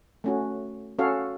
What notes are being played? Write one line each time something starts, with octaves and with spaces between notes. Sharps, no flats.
A3 C#4 F#4
C#4 F#4 A4 C#5 F5